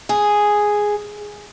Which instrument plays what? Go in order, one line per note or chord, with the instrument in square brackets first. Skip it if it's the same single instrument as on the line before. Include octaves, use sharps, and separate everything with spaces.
[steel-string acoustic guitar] G#4